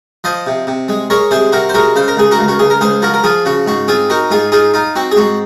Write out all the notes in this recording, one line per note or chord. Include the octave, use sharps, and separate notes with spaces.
F3 C5 D#5
C3
C3
G#3
G#3 A#4 C#5
C3 G#4 C5
C3 F#4 A#4
C5
G#3 F#4 A#4
C#3 C5
A#4
C#2 G#4
F#4 A#4
C#2
F#4
C#2 G#4
A#4
C#2 G#4 C5
F3 F#4 A#4
A#4
F3 F4 G#4
C#3 F#4
G#2 F#4
C4 F4 G#4
D#4 F#4 A#4
G#2 F4 G#4
D#4 F4 G#4
D#4 F4
C4 F#4
G#4
G#2 F#4